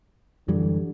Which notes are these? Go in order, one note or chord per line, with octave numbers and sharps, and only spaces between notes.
F#2 D3 E3 G3